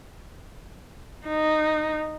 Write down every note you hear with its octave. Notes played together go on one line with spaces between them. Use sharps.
D#4